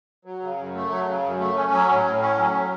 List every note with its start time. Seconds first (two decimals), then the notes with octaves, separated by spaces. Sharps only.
0.25 F#3
0.42 C#3
0.58 F#2
0.74 A3
0.90 F#3
1.07 C#3
1.23 F#2
1.39 A3
1.56 C#4
1.72 F#3
1.89 A2
2.05 A2
2.21 C#4
2.38 F#3
2.54 A2